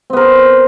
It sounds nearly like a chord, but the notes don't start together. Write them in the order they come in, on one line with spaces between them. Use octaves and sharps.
C4 B3 A#4